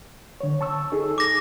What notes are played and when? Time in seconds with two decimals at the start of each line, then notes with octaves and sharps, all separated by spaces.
0.41 D3 C#5
0.61 A5 C#6 E6
0.92 D#4 G#4 A4
1.18 D6 A#6